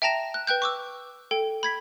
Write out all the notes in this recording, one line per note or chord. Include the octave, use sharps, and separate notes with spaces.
E5 G5 A5 A#5 A#6 E7
F#6
B4 G5 F#6 G6
C#6 D6 E6
A4 G5
B5 G#6 B6